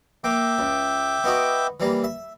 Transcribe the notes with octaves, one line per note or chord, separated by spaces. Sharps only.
A#3 E5 G5 D6
C#2
B3 D#4 F#4
E3 G3 A#3
E5